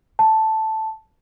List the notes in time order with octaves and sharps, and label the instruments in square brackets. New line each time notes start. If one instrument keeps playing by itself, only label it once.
[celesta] A5